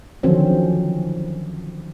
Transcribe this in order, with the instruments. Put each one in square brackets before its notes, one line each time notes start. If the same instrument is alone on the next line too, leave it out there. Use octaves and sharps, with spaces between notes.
[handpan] D3 D#3 F3 F#3 C4 C#4